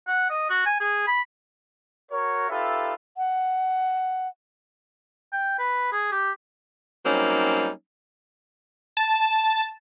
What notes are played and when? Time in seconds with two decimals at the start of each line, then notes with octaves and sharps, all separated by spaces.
0.07 F#5
0.30 D#5
0.50 F#4
0.66 G#5
0.80 G#4
1.07 B5
2.12 F#4 A#4 C#5
2.49 D#4 F4 G4 A4 B4 E5
3.17 F#5
5.33 G5
5.59 B4
5.92 G#4
6.12 G4
7.06 F#3 G3 A#3 C4 C#4 D#4
8.97 A5